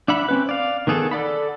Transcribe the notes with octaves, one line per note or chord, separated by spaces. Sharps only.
D4 E5 F#5 B5
C4 C#4 B4
D5 F5
D#3 B3 G#4 A4
A4 D5 F#5 B5